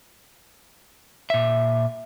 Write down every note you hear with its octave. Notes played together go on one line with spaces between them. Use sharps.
A#2 E5